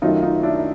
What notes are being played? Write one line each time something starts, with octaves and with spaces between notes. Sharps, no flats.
F#2 D#3 F#3 A3 D#4 F4
D#4 F4
D4 E4